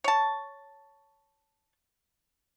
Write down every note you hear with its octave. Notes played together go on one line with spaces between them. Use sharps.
C#5 A5